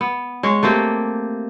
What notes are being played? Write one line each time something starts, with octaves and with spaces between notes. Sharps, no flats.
B3
G#3 C#5
A3 A#3 C4 G4